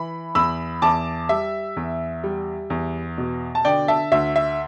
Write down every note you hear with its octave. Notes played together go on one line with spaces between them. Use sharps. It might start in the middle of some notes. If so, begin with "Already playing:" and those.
Already playing: E3 B5
E2 B5 E6
E2 A5 D6
G3 E5
E2
G3
E2
B2
A5
D3 D5 G5
E5 A5
D2 E5
E5